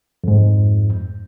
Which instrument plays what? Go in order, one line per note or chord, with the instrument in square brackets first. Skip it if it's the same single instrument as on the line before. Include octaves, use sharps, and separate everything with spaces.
[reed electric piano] F2 G#2